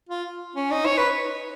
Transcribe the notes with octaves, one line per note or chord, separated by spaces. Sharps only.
F4
C#4
D#4
C#5
B4